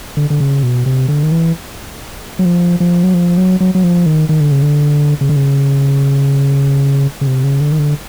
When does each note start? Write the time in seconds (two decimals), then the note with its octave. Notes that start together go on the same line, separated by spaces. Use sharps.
0.17 D3
0.30 D3
0.40 C#3
0.63 B2
0.86 C3
1.08 D3
1.23 D#3
1.32 E3
2.39 F#3
2.45 F3
2.80 F3
3.03 F#3
3.14 F3
3.37 F#3
3.60 F#3
3.75 F#3
3.84 F3
4.06 D#3
4.29 D#3
4.41 D3
4.52 C#3
4.62 D3
5.21 C#3
5.29 D3
5.36 C#3
7.21 C#3
7.27 C3
7.44 C#3
7.60 D3
7.72 D#3
7.79 D3